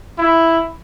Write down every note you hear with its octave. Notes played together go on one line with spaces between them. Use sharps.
E4